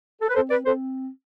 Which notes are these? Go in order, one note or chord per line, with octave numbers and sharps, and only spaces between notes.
A4
B4
C4 A4 C5
B4 D5
C4 A4 C5